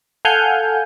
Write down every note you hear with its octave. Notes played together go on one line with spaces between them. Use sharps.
A4 F5 F#5 G#5 F6 G6